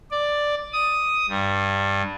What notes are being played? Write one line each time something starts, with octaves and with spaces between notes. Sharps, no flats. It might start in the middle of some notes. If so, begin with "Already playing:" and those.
D5
D#6
G2